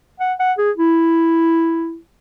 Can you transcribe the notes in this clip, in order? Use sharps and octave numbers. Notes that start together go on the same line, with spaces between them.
F#5
F#5
G#4
E4